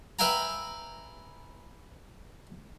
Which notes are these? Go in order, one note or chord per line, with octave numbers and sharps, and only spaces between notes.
B4 E5 F5 G5 G#5 A#5